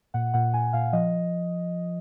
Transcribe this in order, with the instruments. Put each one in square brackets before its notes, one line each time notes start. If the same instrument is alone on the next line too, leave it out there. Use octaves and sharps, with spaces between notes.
[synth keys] A#2 F#5
A#2 F#5
A#2 G#5
A#2 F5
F3 D#5